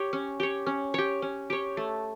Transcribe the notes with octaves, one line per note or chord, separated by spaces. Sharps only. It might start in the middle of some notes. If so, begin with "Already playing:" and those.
Already playing: G4 C#5
C#4
G4 C#5
C#4
G4 C#5
C#4
G4 C#5
A3